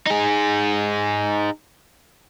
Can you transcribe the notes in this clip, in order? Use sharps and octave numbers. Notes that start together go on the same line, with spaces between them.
D#4 G#4